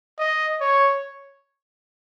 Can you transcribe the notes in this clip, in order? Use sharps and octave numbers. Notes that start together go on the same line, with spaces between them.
D#5
C#5